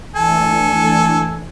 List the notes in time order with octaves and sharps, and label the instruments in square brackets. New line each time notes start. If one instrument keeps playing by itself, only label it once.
[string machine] E3 A3 D4 [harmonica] A4 [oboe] G#5